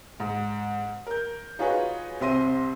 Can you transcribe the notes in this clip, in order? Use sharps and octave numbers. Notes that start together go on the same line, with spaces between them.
G#2
A#4 G6
D#4 F4 F#4 G#4 B4 C#5
C2 C4 E5 C6 A#6 D#7